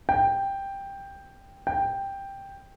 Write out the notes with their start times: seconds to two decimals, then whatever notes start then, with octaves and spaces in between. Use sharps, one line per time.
0.09 G5
1.67 G5